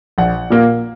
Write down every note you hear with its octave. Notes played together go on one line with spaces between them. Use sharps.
A#1 F#5
A#2 A#3